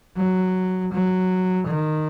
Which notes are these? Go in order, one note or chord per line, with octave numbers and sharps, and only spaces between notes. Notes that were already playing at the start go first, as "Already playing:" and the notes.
F#3
F#3
D#3